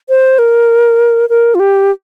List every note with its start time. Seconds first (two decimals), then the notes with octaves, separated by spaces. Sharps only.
0.09 C5
0.39 A#4
1.29 A#4
1.55 F4
1.60 G4